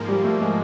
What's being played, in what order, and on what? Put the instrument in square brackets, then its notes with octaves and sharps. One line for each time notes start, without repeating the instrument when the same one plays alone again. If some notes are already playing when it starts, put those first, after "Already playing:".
Already playing: [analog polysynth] G#2 F3 A#3
[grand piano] G3
A3
G#3